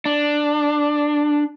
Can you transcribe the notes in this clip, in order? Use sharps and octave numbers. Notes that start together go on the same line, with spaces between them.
D4